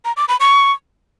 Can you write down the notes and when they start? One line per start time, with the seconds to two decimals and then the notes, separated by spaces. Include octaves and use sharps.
0.05 A#5
0.17 D6
0.28 B5
0.40 C#6